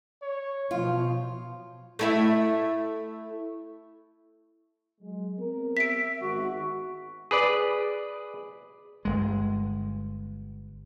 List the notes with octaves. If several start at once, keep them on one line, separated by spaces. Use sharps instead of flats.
C#5
B2 F3 F4
A3 E4 E5
F#3 G#3
B3 C4 A#4
E5 B6 D7
G#1 F#4 F#5
G#4 B4 D5
G1 G#3